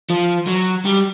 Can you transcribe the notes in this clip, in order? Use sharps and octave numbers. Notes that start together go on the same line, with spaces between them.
F3
F#3
G3